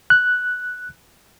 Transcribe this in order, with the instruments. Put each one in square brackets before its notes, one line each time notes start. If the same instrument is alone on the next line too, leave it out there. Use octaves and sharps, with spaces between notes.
[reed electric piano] F#6